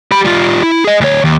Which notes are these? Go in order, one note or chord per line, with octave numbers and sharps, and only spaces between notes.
G4 B5
G3 F4
E4
G#4 D#5
D2 C#5
D#2